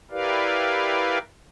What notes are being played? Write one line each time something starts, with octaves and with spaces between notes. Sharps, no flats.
E4 G4 A#4 B4 D5 F5